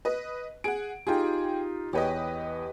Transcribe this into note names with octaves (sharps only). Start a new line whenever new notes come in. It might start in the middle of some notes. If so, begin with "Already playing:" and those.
B4 D#5
G#4 F#5 D7
D#4 F4 G4 G#4 G5
E2 G4 B4 C#5 D#5 G5